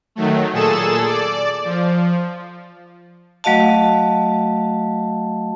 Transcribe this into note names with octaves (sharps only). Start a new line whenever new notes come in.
D#3 F#3 A3
A#2 G#4 A4 E7
D5
F3
F#3 A3 F#4 D#5 F5 A5